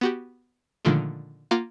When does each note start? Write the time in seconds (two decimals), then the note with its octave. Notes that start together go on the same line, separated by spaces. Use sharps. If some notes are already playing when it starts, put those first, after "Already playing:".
0.01 B3 F#4 G4
0.85 A#2 D3 D#3 F3 G#3 A3
1.51 A#3 F4 A#4 F5 F#5 D6